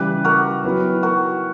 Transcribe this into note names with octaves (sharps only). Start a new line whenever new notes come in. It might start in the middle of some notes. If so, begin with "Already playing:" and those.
Already playing: C#3 E3 G3 G4 B4
F#4 A#4
F#3 B3 E4 B4
F#4 A#4